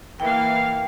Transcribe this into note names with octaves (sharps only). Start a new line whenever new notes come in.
E3 A#3 F5 G5